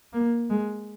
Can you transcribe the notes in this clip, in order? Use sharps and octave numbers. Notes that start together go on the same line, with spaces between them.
A#3
G#3